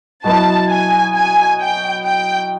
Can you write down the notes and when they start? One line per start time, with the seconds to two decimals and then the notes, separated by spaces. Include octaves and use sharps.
0.24 B2 F#3 B3 E4 A5
0.69 G#5
1.15 G#5
1.60 G5
2.05 G5